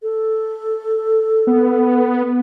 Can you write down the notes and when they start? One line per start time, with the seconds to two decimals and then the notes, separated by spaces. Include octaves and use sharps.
0.03 A4
1.47 B3